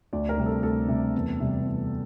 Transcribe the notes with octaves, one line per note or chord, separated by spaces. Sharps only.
D2 D5
A#4
C3 G3 C4
A4
D2 A4
C3 G3 C4
E2
C3 G3
E2